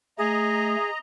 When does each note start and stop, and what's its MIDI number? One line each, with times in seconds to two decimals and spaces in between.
0.18 0.76 57
0.18 0.90 68
0.18 0.99 75
0.18 0.99 82